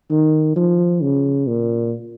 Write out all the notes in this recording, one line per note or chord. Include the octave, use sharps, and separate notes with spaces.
D#3
F3
C#3
A#2